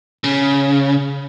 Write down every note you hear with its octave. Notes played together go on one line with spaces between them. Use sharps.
C#3